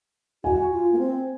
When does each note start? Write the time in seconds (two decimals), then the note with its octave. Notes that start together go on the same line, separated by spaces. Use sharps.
0.44 F#4 G#5
0.72 F4
0.92 A#3
0.99 C4